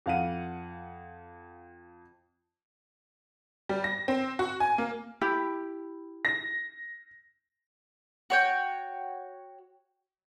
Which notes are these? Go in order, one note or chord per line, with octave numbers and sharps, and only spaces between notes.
F2 F5 F#5 D#7
G3
A#6
C4
F#4
G#5
A#3
E4 G4
A#6
F#4 C#5 G5